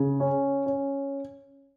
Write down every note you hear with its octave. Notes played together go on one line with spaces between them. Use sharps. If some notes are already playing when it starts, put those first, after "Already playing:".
Already playing: C#3
C#4
C#4